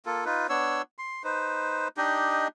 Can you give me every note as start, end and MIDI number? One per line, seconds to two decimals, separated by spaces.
0.06 0.25 58
0.06 0.25 65
0.06 0.25 69
0.25 0.47 63
0.25 0.47 65
0.25 0.47 71
0.49 0.82 59
0.49 0.82 62
0.49 0.82 73
0.49 0.82 88
0.98 1.23 84
1.24 1.88 63
1.24 1.88 71
1.24 1.88 72
1.97 2.48 62
1.97 2.48 63
1.97 2.48 67
1.97 2.48 75